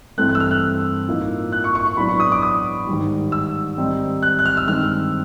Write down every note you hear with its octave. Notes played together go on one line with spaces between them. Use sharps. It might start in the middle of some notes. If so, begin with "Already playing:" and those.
G2 E3 A3 C4 F#6
F#6
E6
F6
F#6
A2 F3 A#3 D#4
F#6
C#6
C#6
C#6
A2 F#3 B3 D4 B5
C#6
D#6
D6
D#6
G#2 D#3 G3
E6
G#2 D#3 G3 C4 D#4
F#6
F#6
F6
E6
G2 D#3 G#3 C4 F6